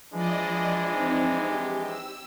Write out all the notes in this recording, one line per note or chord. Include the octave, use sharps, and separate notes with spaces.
E3 F3 G#3 D4 D5 D#5
C4 D#4
G4
E6